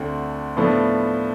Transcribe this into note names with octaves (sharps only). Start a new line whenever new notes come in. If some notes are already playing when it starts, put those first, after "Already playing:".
Already playing: D2 D3 A3 C4
A2 F3 B3 D4 A4